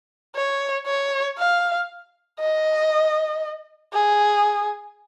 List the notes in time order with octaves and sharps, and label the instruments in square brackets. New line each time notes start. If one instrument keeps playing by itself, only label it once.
[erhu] C#5
C#5
F5
D#5
G#4